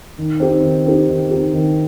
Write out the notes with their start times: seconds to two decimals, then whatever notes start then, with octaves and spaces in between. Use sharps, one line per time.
0.18 D#3
0.40 C4 D#4 G4
0.62 D#3
0.86 C4 D#4 G4
1.08 D#3
1.31 C4 D#4 G4
1.53 D#3